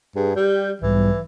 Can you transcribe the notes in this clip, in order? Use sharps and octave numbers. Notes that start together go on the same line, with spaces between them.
G2 G#4
G3 G4 G6
B1 G#2 E3 G3